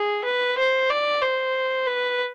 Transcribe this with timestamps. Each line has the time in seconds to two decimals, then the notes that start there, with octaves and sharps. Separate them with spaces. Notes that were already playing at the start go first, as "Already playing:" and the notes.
Already playing: G#4
0.25 B4
0.58 C5
0.90 D5
1.21 C5
1.87 B4